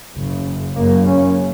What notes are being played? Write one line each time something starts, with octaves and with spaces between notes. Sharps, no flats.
F#1 F#2 C#3
F#1 F#2 C#3 A#3
C#4